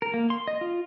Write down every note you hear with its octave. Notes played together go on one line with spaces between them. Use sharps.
A#4
A#3
C6
D#5
F4